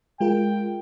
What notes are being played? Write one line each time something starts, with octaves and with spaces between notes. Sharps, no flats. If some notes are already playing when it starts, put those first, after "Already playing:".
G#3 F4 A#4 G5